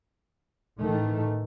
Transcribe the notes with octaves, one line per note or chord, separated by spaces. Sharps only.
A1 D#3 E3 A3